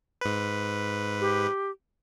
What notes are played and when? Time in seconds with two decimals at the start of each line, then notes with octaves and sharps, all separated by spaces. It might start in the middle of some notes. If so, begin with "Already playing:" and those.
0.21 G#2 B4
1.20 G4